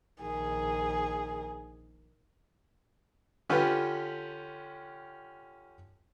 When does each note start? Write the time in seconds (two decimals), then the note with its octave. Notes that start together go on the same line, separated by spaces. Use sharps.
0.21 A#1 D#3 G#4
3.49 D3 C#4 F4 G4 B4